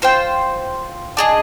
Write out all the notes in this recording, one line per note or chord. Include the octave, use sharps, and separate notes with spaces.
F4 C5 G5
D4 G#4 D#5